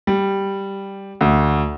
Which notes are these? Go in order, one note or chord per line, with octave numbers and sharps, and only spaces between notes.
G3
D2